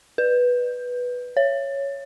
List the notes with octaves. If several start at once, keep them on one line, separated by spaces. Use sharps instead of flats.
B4
C#5